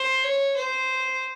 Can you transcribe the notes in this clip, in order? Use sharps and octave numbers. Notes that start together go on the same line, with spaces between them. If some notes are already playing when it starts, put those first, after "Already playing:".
Already playing: C5
C#5
C5